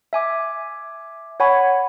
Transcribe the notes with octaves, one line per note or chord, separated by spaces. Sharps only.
E5 G#5 D6
C#5 F#5 G#5 B5 C#6